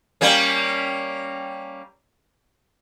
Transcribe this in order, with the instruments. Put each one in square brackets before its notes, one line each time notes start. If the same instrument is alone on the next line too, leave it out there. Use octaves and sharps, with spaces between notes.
[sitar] G3 A#3 C#4